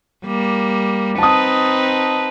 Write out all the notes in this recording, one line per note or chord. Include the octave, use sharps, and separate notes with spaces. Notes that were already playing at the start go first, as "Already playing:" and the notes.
G3 A#3
C4 D#4 B4 A5 D#6